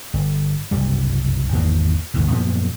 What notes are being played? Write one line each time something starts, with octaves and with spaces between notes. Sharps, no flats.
G1
F#1 C2 G2 G3
G#1 E2 D#3 A#3
G1 D#2 G#2
F#2 A#2 F3 B3